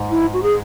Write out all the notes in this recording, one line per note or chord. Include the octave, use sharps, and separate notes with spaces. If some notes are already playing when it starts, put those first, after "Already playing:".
Already playing: G#2
E4
F#4
G#4